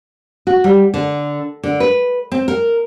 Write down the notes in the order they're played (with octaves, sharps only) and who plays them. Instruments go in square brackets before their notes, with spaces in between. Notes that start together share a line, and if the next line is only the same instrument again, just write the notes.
[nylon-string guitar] F#4
G3
D3
D3
B4
C4
A#4